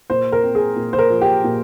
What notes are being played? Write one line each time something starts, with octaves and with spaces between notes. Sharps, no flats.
A#2 C5
A#4
C4
G#4
A#2
C5
A#4
F3
G4
A#2